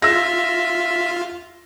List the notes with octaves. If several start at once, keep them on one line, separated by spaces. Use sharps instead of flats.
F4 E5 E6 A#6